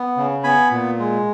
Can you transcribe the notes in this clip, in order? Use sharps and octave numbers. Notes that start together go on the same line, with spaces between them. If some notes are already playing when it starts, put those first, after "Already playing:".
Already playing: B3
C#3
B3 G#5 B5
A#2
G#3